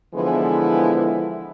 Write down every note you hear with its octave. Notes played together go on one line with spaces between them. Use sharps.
D3 E3 F3 G#3 B3 E4